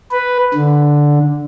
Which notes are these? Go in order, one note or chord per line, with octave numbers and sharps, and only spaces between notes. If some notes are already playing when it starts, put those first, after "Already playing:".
B4
D3